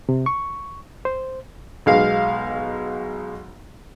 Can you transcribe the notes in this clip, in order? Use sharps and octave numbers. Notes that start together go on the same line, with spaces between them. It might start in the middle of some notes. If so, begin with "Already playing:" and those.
C3
C#6
C5
B1 G#3 F5